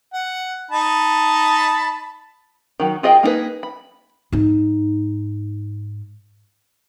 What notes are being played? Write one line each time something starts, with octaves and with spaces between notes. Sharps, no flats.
F#5
D#4 A5 B5
D#3 F#3
F4 G#4 D#5 F#5 G5
A#3 D#4 E4 G#4 B4
B5
G#2 D#4